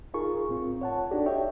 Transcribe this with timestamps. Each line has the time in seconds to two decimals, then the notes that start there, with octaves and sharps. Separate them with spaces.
0.14 D#4 F4 G#4 A#4 C#6
0.49 A2 C4 F4
0.81 C#5 F#5 A5
1.11 D4 D#4 F#4 G4 A4 D5
1.26 C#5 D#5 E5 G5